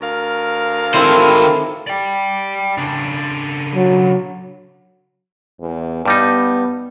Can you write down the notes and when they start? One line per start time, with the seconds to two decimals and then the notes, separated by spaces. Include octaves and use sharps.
0.02 D2 A#4 F5
0.94 D#3 C4 E4 A4 C5
1.87 D5 G5
2.78 C#3 D4
3.75 F#3
5.61 E2
6.05 G2 G3 B3 D#4